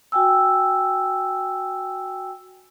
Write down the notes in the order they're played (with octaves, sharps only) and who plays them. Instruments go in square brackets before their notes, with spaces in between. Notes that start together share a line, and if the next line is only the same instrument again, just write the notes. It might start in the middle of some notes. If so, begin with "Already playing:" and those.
[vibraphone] F#4 G5 G#5 E6